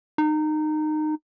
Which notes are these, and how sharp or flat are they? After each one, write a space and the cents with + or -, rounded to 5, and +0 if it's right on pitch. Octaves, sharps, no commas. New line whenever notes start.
D#4 -20